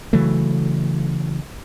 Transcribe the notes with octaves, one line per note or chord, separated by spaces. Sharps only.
C#3 E3 F#3 A3